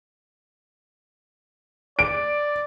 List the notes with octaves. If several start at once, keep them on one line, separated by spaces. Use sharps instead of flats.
D5 D7